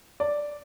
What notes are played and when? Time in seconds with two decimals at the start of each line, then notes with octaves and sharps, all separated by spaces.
0.20 D5